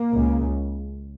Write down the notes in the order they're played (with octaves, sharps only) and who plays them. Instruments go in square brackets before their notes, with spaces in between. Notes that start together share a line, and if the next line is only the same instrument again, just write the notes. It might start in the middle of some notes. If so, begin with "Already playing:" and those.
Already playing: [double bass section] A#3
C#2 C#3